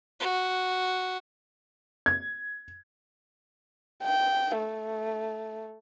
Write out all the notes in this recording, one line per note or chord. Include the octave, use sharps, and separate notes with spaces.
F#4
G#6
G5
A3